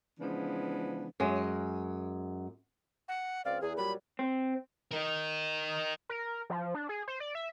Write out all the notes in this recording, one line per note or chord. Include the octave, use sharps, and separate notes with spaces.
C#3 E3 F3 G#3 B3 D4
F#2 G#3
F#5
C#2 C4 D5 F5
E2 G#4
A#2 F#3 G3 B5
C4
A#4 D#5
A#4
F3
D4
G#4
C5
D5
E5